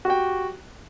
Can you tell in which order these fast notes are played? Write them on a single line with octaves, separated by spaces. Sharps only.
F#4 G4 G5